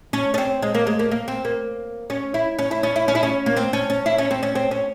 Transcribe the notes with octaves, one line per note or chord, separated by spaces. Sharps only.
C#4
C#4
C4
G#3
A#3
G#3
A#3
A#3
C4
A#3
C#4
E4
C#4
E4
C#4
E4
C#4
E4
C#4
A#3
C4
C#4
C#4
E4
C#4
C4
C#4
C4
C#4